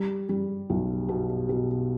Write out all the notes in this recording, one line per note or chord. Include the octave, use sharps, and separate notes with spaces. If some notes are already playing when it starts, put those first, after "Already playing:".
Already playing: G3
G3
B1
B2
B2